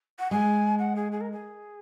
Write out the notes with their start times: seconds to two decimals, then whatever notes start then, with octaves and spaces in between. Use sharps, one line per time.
0.19 F#5
0.31 G#3 G#5
0.79 F#5
0.96 G#4
1.12 G#4
1.21 A#4
1.32 G#4